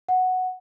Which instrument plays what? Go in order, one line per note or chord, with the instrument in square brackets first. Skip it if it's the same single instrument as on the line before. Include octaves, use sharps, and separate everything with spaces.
[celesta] F#5